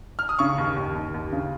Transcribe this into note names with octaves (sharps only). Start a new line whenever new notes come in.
F6
D#6
C#3 C#6
D#2
D#2
D#2
D#2
C#3